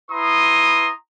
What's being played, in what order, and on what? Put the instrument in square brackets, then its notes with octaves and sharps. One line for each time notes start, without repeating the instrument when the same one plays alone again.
[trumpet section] E4 B4 A#5 C6 D#6